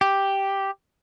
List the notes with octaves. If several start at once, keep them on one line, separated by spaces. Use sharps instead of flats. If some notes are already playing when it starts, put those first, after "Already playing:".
G4